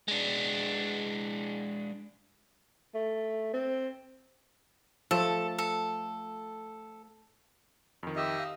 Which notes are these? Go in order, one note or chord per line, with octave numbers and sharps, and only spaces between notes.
G#3 D4
A3
C4
F3 A3 A4
A4
F2 D#3
G4 D#5 E5
F5